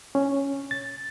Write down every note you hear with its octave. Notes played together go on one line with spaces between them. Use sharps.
C#4
A6